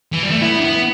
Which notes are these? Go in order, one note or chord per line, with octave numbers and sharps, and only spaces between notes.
E3
G3
A3
B3 E4
D4
B3